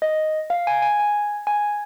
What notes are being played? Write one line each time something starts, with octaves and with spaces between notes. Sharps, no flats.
D#5
F5
G#5
G#5
G#5
G#5